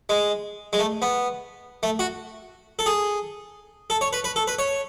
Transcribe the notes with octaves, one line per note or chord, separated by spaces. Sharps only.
G#3
G#3
A3
B3
A3
F#4
A4
G#4
A4
C#5
B4
B4
A4
B4
C#5